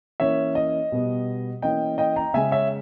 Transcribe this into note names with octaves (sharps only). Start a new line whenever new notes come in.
E3 A#3 C#4 C#5 E5
D#5
B2 G3 B3
E3 A#3 C#4 D#5 G5
D#5 G5
G5 A#5
C#3 G#3 C#4 E5 G#5
C#5 E5